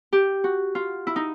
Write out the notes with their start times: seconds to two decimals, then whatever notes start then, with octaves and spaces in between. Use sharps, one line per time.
0.13 G4
0.44 F#4
0.75 F4
1.07 E4
1.16 D#4